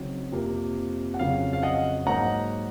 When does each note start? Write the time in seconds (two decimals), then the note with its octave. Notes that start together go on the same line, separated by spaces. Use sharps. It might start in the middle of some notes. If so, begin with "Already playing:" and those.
Already playing: C#3 F#3 C4 D#4
0.32 F2 C3 F3 A#3
1.14 F#5
1.19 F2 C#3 F#3 C#4 F5
1.53 F5
1.63 D#5 F#5
2.07 G#2 F#3 A#3 D#4 F#5 A#5